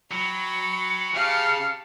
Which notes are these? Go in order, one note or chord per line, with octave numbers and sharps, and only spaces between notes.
F#3 G5 B5 C#7
C#3 G4 F5 A5